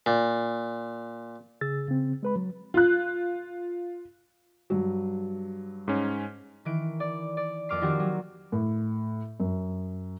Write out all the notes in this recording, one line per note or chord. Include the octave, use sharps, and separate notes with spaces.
A#2
C#3 G#4 E6 A6
C#3 C4
G#3 B4 B5
F#3
F4 F#6
G2 F#3
G#2 C#4
D#3 E3 D7
D5
D5
F2 A#3 D6 F6 C7
D#3 F3 C4 F#4 G4
F#3
A2
F#2